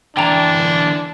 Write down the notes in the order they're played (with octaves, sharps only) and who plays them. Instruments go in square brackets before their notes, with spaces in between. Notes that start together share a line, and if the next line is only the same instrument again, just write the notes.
[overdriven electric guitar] D3 E3 [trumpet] D4 [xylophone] G5 A5 A#5